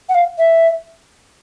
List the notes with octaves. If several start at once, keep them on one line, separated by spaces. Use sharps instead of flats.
F#5
F5
E5